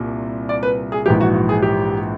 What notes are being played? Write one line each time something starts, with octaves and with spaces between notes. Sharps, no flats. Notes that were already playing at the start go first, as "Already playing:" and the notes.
Already playing: C2 A#2
D5
B4
G#4
A#1 G#2 E3 G4
F#4
F#4
G#4
G4